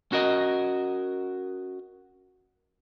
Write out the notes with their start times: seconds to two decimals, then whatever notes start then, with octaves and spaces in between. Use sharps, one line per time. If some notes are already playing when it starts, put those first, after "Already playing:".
0.12 C#4 F#4 A#4 D#5